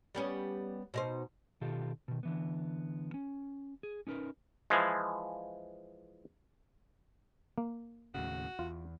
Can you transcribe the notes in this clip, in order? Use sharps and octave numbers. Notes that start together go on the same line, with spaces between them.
G3 B3 C#4
B2 D#4 C5
B2 D#3 F4 G4 A4
B2 D#3
D3 E3 B3
C#4
G#4
C#4 D#4 A#4 B4
E3 F3 G#3
A#3
D#2 A2 C#3 F#4
E2 F4